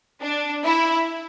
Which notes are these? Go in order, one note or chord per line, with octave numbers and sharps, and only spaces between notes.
D4
E4